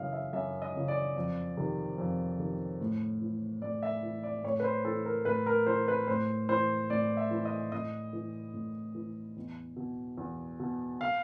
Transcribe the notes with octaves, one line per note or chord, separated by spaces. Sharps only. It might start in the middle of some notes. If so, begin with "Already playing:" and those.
Already playing: F#2 C#3 E3 D#5 F5
E5
F#2 E5
D#5
C#3 E3
D5
F2
C3 D#3
F2
C3 D#3
A2
E3
A2 D5
E5
E3
D5
A2 C#5
B4
C5
E3 A4
A#4
A2 B4
A#4
E3 C5
B4
A2 C5
E3 C5
A2 D5
E5
E3
D#5
A2 D#5
E3
A2
E3
E2
B2
E2
B2
F5